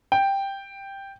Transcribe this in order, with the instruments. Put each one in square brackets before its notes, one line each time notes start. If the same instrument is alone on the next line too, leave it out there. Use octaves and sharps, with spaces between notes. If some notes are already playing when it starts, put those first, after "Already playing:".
[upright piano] G5